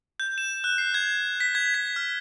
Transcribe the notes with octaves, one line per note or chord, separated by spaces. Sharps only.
G6
E7
F#6
C7
G#6
B6
G#6
B6
F6